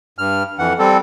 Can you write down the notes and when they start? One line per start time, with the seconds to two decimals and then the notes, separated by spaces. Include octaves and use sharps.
0.18 G2 F6
0.59 F2 E3 F#5
0.79 G3 C4 A4